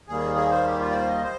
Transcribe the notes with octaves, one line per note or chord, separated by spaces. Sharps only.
D#2 D#3 G3 A#3 G#4
G#4
C5
G4
F4
D5
C5
D#5
C5